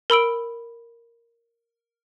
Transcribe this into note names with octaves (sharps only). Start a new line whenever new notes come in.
A#4 B5 E6 D7